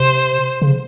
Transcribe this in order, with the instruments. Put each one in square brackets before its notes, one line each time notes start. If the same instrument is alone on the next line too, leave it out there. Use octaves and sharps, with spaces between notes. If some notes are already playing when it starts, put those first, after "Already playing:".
Already playing: [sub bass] C3 [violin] C5
[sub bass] C#3